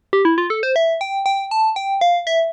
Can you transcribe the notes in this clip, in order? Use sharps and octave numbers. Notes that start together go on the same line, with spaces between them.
G4
E4
F4
A4
C5
E5
G5
G5
A5
G5
F5
E5